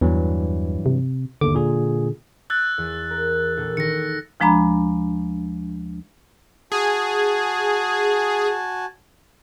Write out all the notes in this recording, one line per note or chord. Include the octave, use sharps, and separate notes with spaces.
E2 G2 E3 F#3
C3
G1 D#2 D3 D6
A#2 G#4
E6 F#6 G#6 A6
E2
A#4
A#1 A4 G6
D#3 A4 A#6 C#7
D2 F3 G#3 D4 A#5 B5
F#4 G#4 G#5 A5